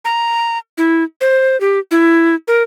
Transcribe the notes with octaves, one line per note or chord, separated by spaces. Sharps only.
A#5
E4
C5
G4
E4
A#4